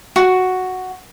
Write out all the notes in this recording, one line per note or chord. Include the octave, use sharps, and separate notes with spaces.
F#4